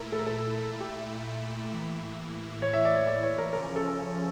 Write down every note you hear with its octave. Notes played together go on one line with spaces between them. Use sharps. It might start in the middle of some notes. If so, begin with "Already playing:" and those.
Already playing: A#2 A3 E4 A#4
A4
A#4
A4
G4
A2 E3 A#3 E4
C#5
E5
D5
C#5
D5
C#5
A#4
C#3 F3 C#4 A#4
A4